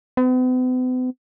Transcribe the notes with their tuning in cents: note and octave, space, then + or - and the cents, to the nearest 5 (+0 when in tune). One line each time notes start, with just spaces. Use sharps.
B3 +45